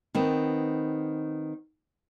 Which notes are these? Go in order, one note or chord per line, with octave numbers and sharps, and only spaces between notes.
D#3 B3 C4